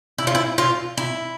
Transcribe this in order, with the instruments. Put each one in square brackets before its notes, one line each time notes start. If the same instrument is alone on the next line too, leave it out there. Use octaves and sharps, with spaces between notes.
[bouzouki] E4
F4
E4
F4
E4